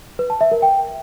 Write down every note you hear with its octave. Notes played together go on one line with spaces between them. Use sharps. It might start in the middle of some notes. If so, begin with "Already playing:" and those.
B4
A5
E5
A#4
G5